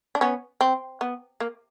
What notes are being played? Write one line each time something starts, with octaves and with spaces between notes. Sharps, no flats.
D4
B3 C#4
C4
B3
A#3